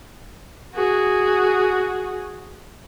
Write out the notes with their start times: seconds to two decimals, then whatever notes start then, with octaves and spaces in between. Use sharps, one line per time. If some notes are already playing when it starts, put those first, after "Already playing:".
0.74 F#4 G#4